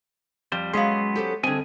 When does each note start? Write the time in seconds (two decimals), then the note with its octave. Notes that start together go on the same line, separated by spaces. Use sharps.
0.52 F2 F3 G3 C5
0.74 F#3 G#3 B3 C#4 G#4 F5 C6
1.15 G4 A4 C5
1.43 D3 G3 C4 G#4 A4 D#5 G#5